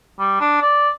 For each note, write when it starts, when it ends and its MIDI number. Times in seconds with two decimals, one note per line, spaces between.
0.20 0.39 55
0.41 0.58 62
0.62 0.90 74